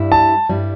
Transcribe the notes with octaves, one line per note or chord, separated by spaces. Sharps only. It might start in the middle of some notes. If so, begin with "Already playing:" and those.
Already playing: G2 G3 E4
A5
G2 G3 E4